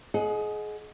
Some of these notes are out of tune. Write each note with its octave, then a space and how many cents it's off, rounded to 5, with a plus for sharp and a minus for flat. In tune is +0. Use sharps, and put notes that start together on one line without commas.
G#4 +30 D#5 +0 F#5 -10